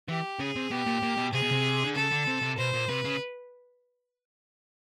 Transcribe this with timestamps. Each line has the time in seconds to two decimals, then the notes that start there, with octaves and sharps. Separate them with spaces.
0.09 E3 G4
0.40 C#3 G#4
0.56 C3
0.71 B2 G4
0.87 A#2
1.03 A#2
1.17 B2
1.33 C3 G#4
1.42 B2
1.52 C3
1.83 D3
1.95 C#3 A4
2.11 D3
2.27 C3
2.42 C3
2.58 B2 C5
2.73 A#2
2.88 C3 B4
3.05 C#3